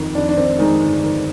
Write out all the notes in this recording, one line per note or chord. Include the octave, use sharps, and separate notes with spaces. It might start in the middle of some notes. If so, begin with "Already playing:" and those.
Already playing: F2 D#3
F2 D4
D4
D#3 C4
D#3 G#3 D#4
G1
D#3